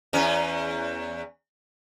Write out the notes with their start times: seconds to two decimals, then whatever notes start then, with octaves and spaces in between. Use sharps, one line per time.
0.13 E2 C#4